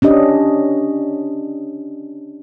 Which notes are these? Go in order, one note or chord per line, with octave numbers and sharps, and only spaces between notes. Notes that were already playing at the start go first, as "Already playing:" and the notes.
C#4 D4 G4 D#5